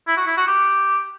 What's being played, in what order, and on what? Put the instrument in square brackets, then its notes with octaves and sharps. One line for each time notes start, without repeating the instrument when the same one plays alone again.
[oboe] E4
F#4
E4
F#4
G4